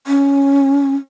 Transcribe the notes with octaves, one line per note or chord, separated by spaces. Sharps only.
C#4